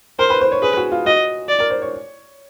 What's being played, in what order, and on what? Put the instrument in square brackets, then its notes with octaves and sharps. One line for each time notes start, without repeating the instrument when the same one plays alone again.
[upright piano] A#4 [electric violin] C5
[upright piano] B4
C5
C#5
[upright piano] G#4 [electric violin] B4
[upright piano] F#4
F4
[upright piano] F#4 [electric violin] D#5
[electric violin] D5
[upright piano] A#4
C5
C#5